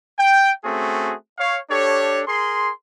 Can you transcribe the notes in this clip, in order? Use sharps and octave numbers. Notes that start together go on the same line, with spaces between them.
G5
A3 C4 C#4 F#4 G#4
C#5 F5
D4 G4 A4 C#5
G#4 A#4 C6